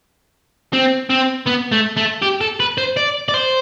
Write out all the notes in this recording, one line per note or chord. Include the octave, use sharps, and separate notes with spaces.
C4
C4
B3
A3
A3
G4
A4
B4
C5
D5
D5
C5